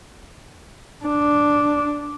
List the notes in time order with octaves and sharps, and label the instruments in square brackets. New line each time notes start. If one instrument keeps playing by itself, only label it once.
[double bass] D4